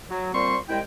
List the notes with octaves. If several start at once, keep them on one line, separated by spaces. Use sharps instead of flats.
F#3
A#2 G3 C4 C5 C6 C#6
C2 G#3 E4 G5